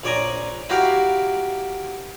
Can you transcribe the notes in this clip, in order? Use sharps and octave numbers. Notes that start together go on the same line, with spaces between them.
A#1 C#5 D5 G#5 A#5
E4 F#4 G4 A#4 F5